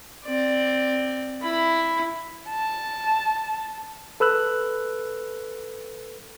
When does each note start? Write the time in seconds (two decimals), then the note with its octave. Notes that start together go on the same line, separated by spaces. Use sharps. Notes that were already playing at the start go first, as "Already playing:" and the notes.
0.25 C4 D5
1.42 E4 B5
2.49 A5
4.20 A4 B4 E6 F#6